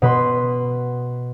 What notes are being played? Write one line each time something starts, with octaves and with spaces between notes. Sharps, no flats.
B2 B4 C6